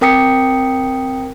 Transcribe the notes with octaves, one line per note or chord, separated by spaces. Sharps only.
C4 A#4 G5 D#6 B6 C#7